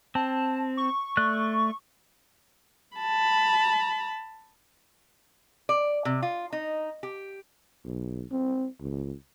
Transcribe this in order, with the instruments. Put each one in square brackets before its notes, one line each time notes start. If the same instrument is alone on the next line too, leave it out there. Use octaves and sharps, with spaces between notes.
[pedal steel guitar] C4 [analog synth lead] A5
[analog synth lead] C#6
[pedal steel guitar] A3 D5 F#6
[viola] A5 B5
[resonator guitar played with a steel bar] D5
C3
F4
D#4
G4
[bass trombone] B1
C4
C#2